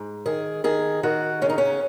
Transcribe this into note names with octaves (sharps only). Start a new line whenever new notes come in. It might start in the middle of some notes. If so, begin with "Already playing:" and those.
Already playing: G#2
D#3 G#4
D#3 G#4
D#3 F#4
C#3 C#4
D#4
C#4